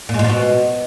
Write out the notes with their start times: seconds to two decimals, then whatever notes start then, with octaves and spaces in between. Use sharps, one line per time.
0.09 A#2
0.14 G#3
0.19 A#2
0.24 F3
0.29 B2